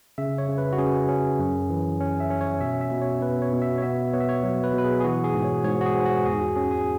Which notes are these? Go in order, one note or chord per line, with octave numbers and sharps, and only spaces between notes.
C#3 E5
C#5
C#3
B4
F#4
C#4 G#4
C#4
F#2
E3
C#4
E5
C#4
C#5
B2 E5
E5
B2
C#5
B3 B4
C#5
B2
E5
C#5
B3 E5
B3 C#5
E5
C#5
F#3
B4
B2
B4
G#4
G#4
E3 F#4
G#4
G#2
C#5
G#2 C#5
F#4
G#4
G#2
F#4
E2 G#4
F#4
C#4 G#4
G#4